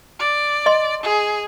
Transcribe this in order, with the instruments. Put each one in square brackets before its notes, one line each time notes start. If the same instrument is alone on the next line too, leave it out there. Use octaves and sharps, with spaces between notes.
[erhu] D5
[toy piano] D#5 C6
[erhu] G#4